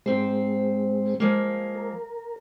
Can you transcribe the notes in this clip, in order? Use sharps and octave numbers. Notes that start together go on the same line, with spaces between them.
G#2 G#3 C4 C5
F3 G#3 A#3
A#4